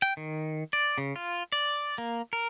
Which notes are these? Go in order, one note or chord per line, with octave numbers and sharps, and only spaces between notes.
G5
D#3
D5
C#3
F4
D5
A#3
A#4